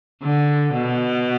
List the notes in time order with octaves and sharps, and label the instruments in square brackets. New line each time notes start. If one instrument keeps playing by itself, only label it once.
[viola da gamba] D3
B2